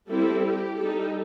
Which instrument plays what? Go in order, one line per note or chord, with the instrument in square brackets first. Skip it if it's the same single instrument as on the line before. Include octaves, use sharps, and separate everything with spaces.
[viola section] G3 C4 E4 A4
G4
G3 D#4 A4